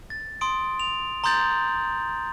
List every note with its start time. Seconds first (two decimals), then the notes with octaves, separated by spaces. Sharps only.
0.10 A6
0.41 C6 D#6 D7
0.80 F7
1.24 A#5 C6 D#6 G6 A6 F#7